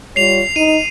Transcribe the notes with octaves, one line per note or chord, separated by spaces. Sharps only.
G3 F4 C#5 C7 F7
D#4 D#5 D#7